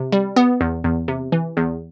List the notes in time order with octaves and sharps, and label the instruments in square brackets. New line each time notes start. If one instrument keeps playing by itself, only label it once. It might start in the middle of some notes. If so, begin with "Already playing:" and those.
Already playing: [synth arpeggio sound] C3
G3
B3
E2
E2
C3
E3
E2